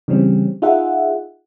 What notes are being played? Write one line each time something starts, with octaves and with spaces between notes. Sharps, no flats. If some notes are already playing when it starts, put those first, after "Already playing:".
C#3 E3 G3 C4 C#4
D#4 F4 G#4 E5 F#5